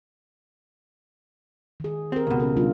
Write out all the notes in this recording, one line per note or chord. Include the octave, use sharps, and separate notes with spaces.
D#3 G#4
C4 G4 A#4
C#2 B2
C#4 A4 A#4
G3 D4 F4